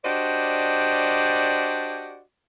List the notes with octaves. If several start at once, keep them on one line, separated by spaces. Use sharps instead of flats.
D4 F#4 G4 C5 D5 D#5